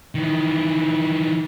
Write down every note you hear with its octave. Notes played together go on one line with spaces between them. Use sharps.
D#3 E3